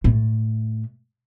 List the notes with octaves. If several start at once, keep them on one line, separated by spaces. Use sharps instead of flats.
A2 A3